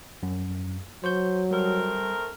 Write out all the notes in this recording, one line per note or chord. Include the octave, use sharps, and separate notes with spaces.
F#2
F#3 C5 C#6 G6
G3 A3 C4 A#4